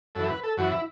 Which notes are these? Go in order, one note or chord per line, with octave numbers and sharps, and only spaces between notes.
F#2 E3 A4
B4
A4
F#2 E3 F#4
E4